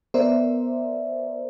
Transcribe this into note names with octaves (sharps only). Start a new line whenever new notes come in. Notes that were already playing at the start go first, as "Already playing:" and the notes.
B3 A#4 C5 D5 E5